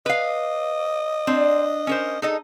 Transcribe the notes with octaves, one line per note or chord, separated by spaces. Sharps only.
B4 D#5 F5
C4 D4
C#4 A#4 C5
D#4 G#4 A4 D#5